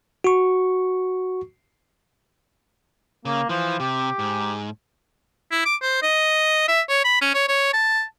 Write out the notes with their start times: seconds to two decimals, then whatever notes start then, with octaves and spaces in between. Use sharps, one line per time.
0.24 F#4 C#6
3.25 C#3 A#3
3.49 E3 F3
3.80 C3 G4
4.19 G#2
5.51 E4
5.65 D6
5.82 C5
6.02 D#5
6.68 E5
6.89 C#5
7.05 B5
7.21 C#4
7.34 C#5
7.48 C#5
7.73 A5